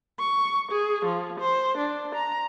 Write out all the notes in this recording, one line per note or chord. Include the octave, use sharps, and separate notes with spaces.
C#6
G#4
F3
C5
D4
A#5